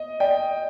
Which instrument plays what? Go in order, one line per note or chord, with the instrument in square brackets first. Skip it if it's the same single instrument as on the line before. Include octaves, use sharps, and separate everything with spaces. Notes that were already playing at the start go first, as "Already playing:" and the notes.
Already playing: [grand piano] D#5
[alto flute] D5 [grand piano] G5